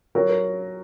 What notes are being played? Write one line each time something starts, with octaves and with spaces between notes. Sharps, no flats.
F#3 A#4
A#4